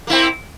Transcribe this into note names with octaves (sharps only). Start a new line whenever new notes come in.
A#3 C4 E4